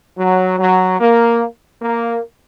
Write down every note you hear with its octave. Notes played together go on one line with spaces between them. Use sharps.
F#3
F#3
A#3
A#3